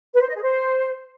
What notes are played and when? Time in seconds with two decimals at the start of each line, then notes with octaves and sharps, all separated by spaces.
0.14 B4
0.21 C5
0.28 D#5
0.35 G#4
0.42 C5